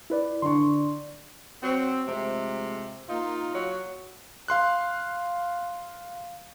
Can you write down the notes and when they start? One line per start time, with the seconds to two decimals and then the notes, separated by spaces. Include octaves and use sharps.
0.10 E4 B4 D5
0.42 D3 D5 C6 C#6
1.63 F#3 C4
2.07 C3 F3 G#3 A3
3.09 A#3 D#4 F4
3.54 F#3
4.48 F5 C6 F#6